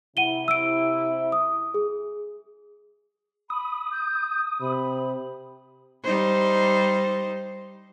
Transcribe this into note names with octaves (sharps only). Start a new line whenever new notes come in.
C3 E4 F#5 D#7 G7
E6 D7
D#6
G#4
B5 D#6
G6
C3 B5
G3 D#4 C5